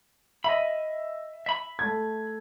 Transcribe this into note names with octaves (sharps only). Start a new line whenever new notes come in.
D#5 E5 B5
E5 B5
A3 G#6